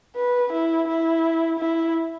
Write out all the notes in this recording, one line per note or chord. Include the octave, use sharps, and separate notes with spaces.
B4
E4
E4
E4